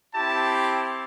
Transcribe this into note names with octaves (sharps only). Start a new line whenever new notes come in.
C4 E4 G4 A5